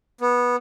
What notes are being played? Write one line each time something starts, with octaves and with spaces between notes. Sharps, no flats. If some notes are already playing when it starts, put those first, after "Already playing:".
B3